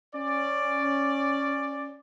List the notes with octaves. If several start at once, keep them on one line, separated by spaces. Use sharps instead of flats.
C#4 D5